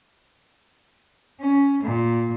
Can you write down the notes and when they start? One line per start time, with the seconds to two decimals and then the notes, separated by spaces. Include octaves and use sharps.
1.40 C#4
1.83 A#2